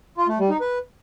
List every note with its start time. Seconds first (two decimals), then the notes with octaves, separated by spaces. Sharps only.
0.18 F4
0.28 A3
0.39 G3
0.50 D#4
0.61 B4